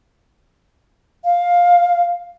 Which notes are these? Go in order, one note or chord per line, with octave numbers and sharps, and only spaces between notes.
F5